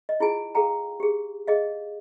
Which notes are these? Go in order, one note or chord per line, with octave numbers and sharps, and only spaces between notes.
D#5
E4 F4 G#4 G#5
G#4 A4 F5 G5 A#5
G4 G#4
G#4 D#5 F5